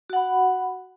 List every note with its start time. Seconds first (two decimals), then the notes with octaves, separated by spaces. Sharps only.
0.10 F#4
0.13 F#5
0.16 B5